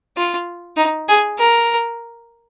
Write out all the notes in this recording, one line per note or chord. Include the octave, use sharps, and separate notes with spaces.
F4
D#4
G#4
A#4